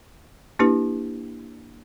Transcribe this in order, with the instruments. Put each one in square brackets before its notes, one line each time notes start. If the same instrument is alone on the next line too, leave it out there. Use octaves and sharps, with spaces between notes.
[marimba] A#3 D4 E4 G4 B4